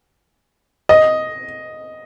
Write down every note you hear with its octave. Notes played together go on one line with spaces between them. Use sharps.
D#5